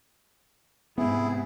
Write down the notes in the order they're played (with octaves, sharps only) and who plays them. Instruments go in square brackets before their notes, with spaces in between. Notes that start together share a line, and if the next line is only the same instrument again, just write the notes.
[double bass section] G#2 C3 [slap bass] B3 C4 [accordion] E4 G#4